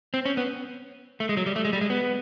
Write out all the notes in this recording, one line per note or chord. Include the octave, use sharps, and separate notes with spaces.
C4
C#4
B3
A3
G#3
F#3
G3
A3
G#3
G3
G#3
B3